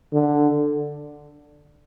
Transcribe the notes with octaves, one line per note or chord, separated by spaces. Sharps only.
D3